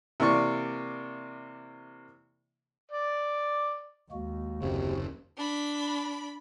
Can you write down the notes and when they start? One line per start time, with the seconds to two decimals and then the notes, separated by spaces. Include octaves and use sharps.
0.20 C3 E3 A#3 D5 C#6
2.92 D5
4.12 D#2 G#3 A#3 F#4
4.62 F#1 C3 F#4
5.38 D4 B5